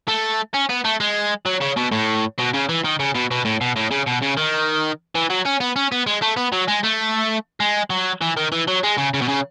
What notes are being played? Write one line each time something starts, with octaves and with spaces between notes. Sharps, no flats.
A3
C#4
B3
A3
G#3
F#3
C#3
B2
A2
B2
C#3
E3
D#3
C#3
B2
B2
A2
B2
A2
C#3
B2
C#3
D#3
E3
F#3
C#4
B3
C#4
B3
G#3
A3
B3
F#3
G#3
A3
G#3
F#3
E3
D#3
E3
F#3
G#3
C#3
C#3
B2
C#3